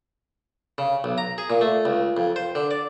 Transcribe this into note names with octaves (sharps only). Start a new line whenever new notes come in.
C#3
B1
A#5
G#4
A#2
A3
C#2
F2
C5
D3
D5